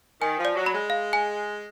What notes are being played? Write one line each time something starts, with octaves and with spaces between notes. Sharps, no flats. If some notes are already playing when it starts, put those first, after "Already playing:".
D#3 G#5
F3
D5
F#3
B5
G#3
F5
G#5